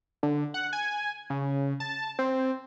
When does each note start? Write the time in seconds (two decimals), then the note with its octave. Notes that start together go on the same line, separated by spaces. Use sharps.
0.23 D3
0.54 F#5
0.73 G#5
1.30 C#3
1.80 A5
2.19 C4